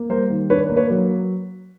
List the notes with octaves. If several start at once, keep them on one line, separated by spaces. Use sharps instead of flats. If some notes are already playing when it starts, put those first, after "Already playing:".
Already playing: A#3
G3 A#4 C5
D#3
D4 B4 C#5
A#3
B4 C#5
F#3